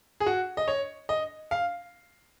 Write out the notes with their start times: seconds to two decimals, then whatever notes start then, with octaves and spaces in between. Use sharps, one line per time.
0.20 G#4
0.26 F#4
0.57 D#5
0.68 C#5
1.09 D#5
1.51 F5